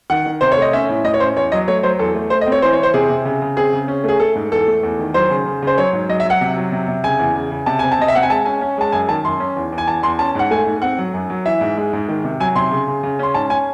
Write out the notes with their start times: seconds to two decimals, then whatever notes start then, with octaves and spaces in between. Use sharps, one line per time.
0.10 D#3 F#5
0.26 D#3
0.41 C3 C5
0.52 C#5
0.57 A3 D#5
0.73 C#4 E5
0.89 A2
1.04 A2 D#5
1.14 C#5
1.20 C#4 C5
1.36 E2 C#5
1.52 F#3 D#5
1.68 A3 C#5
1.83 F#3 C5
1.99 E2 A4
2.15 A3
2.30 A3 C5
2.41 D#5
2.46 C4
2.52 C#5
2.62 E3 C5
2.73 C#5
2.78 E3
2.83 C5
2.94 C3 G#4
3.10 C3
3.25 C#3
3.42 C#3
3.57 C4 G#4
3.73 C#3
3.88 C#4
4.04 A3 G#4
4.20 A3 A4
4.35 G#2
4.52 E2 A4
4.68 A3
4.83 E2
4.99 D#3
5.14 F#3 C5
5.30 C#3
5.46 C#3
5.62 C#3 C5
5.78 F#3 C#5
5.93 G#2
6.09 F#3 D#5
6.20 E5
6.25 F#3
6.30 F#5
6.41 C3
6.57 F#3
6.72 C3
6.88 C3
7.04 C#3 G#5
7.19 E2
7.35 C#3
7.51 C#3
7.66 C3 A5
7.79 C4 G#5
7.92 A5
7.98 C3 D#5
8.08 E5
8.14 C4 F#5
8.23 G#5
8.30 G#3 A5
8.45 C#4 G#5
8.61 C#4
8.78 G#3 A5
8.92 F#2 G#5
9.09 D#3 A5
9.25 F#2 C6
9.40 C#4
9.56 E2
9.72 E2
9.78 G#5
9.87 E2 A5
10.03 E2 C6
10.19 C#4 A5
10.35 G#2 F#5
10.51 A3 G#5
10.67 G#2
10.82 C4 F#5
10.98 F#3
11.14 F#2
11.30 F#3
11.46 E3 E5
11.61 G#2
11.77 G#3
11.93 G#2
12.08 D#3
12.24 C3
12.40 F#3 G#5
12.55 C3 C6
12.71 C#3
12.88 C#3
13.03 C#3
13.19 C#4 C6
13.34 G#2 A5
13.50 C#4 G#5